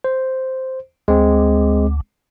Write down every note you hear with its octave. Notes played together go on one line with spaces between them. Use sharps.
C5
D2 G#3 C4